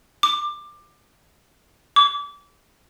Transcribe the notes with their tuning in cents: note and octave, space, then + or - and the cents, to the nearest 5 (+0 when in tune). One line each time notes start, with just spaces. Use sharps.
D6 +20
D6 -30